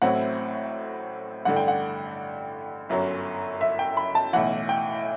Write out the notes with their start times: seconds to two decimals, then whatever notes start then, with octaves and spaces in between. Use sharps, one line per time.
0.02 A1 A2 F#3 C4 E4 F#5
1.45 A1 G2 D3 F#5
1.56 G5
1.68 F#5
2.89 G1 F#2 F#3
3.61 E5
3.79 G5
3.97 B5
4.15 A5
4.33 B1 A2 E3 F#5
4.69 G5